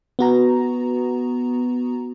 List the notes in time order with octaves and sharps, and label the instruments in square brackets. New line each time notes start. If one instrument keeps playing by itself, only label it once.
[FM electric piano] B3 F#4 A#5